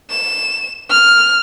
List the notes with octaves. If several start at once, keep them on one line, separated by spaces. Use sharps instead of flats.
E7
F6